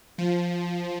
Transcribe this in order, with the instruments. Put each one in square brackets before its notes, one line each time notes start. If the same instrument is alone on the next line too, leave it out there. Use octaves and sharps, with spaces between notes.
[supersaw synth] F3